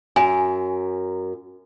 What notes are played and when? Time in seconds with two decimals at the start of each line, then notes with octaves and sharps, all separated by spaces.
0.16 F#2 G#5